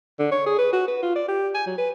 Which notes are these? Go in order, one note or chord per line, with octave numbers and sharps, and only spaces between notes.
D3
C#5
G#4
B4
F#4
B4
F4
D5
G4
G#5
F#3
B4